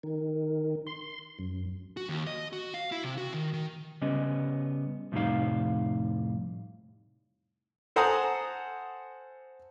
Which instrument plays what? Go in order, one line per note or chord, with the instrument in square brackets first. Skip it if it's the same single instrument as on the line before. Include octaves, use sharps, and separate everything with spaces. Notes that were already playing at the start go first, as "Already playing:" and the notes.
[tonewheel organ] D#3
C6
F#2
[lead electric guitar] F#4
D#2
D#5
F#4
F5
E4
C3
F#4
D#3
D#3
[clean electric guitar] C#3 G3 B3 C#4 D#5
F2 A2 C3 G3 D#4 F5
[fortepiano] A4 C5 F#5 G#5 A#5 D#6